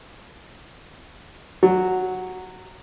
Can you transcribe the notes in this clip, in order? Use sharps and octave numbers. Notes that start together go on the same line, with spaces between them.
F#3